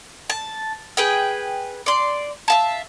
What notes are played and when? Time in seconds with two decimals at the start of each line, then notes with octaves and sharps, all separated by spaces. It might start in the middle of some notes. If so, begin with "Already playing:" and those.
0.30 A5
0.97 G#4 B4 G5
1.86 D5 C6
2.48 E5 F5 A5